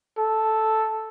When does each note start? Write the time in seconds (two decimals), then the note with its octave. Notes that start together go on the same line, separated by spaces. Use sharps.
0.18 A4